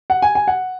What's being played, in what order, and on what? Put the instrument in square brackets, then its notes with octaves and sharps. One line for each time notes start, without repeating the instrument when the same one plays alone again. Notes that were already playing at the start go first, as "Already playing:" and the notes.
[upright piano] F#5
G#5
G#5
F#5